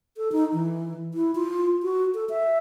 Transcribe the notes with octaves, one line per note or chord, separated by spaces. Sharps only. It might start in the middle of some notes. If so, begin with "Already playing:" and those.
A4
D#4
E3
E4
F4
F#4
A4
E5